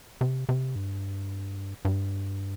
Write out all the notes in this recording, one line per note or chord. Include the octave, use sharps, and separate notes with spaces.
C3
C3
G2
G2